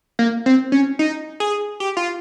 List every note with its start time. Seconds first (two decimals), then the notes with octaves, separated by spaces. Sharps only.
0.19 A#3
0.46 C4
0.72 C#4
0.99 D#4
1.40 G#4
1.80 G4
1.97 F4